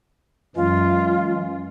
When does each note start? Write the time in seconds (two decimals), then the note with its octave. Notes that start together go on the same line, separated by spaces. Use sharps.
0.56 F#2 E3 G#3 C#4 F4